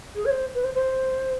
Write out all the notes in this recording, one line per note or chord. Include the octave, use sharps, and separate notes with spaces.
G#4
C#5
C5
B4
C5
C5